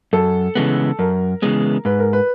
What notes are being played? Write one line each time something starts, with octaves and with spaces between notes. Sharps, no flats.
F#2 A4
C#3 E3 G#3 B3
F#2 A#4
C#3 E3 G#3 B3
G#2 B4
A#4
B4